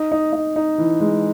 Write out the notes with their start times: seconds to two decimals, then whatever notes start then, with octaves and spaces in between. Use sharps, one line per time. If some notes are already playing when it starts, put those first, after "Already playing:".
Already playing: D#4
0.11 D#4
0.33 D#4
0.56 D#4
0.78 E3
1.00 G#3